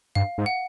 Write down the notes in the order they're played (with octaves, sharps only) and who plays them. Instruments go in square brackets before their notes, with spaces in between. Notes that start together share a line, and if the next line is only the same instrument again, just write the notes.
[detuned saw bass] G2 [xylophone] F5
[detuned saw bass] G#2
[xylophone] F#5